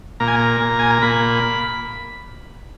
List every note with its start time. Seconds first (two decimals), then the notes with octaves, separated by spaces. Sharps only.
0.20 A#2 A#5
0.28 G#5
0.36 A#5
0.61 A#2
0.79 G#5
0.90 A#5
1.02 A#2 B5